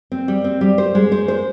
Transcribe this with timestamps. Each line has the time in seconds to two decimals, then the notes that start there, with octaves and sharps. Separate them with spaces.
0.12 C4
0.28 G3
0.44 C4
0.61 G3
0.78 C5
0.95 G#3
1.12 C5
1.28 C5